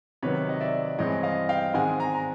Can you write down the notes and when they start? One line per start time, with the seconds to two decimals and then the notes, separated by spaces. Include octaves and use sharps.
0.23 C3 D#3 F#3 B4 C#5
0.49 D#5
0.60 D5 E5
0.98 G2 E3 G#3 C4 C#5 D#5
1.23 D#5 F5
1.49 F5 G5
1.74 G#2 D#3 G#3 C4 F#5 G#5
2.00 G#5 A#5
2.14 A#5